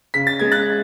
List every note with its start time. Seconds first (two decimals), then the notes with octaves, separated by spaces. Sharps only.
0.14 C#3 B6
0.27 A6
0.39 G#3 G#6
0.52 F#6 A6